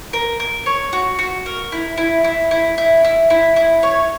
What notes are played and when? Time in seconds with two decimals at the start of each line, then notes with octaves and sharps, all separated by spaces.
0.13 A#4
0.40 A#4
0.66 C#5
0.93 F#4
1.19 F#4
1.46 A#4
1.72 E4
1.98 E4
2.24 E4
2.51 E4
2.78 E4
3.05 E4
3.30 E4
3.56 E4
3.83 C#5